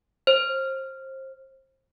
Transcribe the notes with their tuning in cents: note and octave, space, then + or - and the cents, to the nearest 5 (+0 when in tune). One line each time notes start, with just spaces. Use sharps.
C5 +25